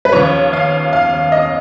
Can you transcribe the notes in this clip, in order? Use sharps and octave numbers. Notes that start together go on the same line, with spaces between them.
B4
D#2 C#3 F3 C#5
F5
F5
D#5